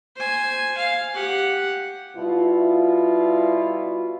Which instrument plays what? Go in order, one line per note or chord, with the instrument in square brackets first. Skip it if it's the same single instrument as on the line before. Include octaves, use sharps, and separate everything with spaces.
[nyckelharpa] C5 G#5
F5
G4 F#5
[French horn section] B2 G3 E4 F4